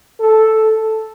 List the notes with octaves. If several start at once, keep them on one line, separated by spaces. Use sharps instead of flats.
A4